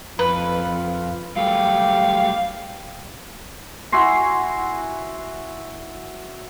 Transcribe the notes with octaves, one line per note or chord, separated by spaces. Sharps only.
F2 F4 B4
F#3 G3 A3 G4 F5
E4 F#4 G#5 C6